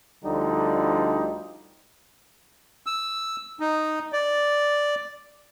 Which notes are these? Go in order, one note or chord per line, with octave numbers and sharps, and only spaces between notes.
D2 D3 F3 G3 D#4
E6
D#4
D5